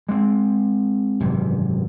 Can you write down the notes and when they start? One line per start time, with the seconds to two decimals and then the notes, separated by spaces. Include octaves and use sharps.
0.09 G#3 C4
1.20 G#1 F#2 C3 E3